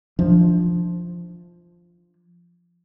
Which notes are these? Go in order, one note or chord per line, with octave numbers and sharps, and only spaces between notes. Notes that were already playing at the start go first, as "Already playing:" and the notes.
F3 D4